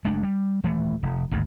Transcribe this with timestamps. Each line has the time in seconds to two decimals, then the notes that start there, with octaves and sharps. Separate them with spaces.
0.04 F#1 G#3 A3 D4
0.23 G3
0.63 D#1 E3 A3
1.03 F1
1.31 G#1 D2 G2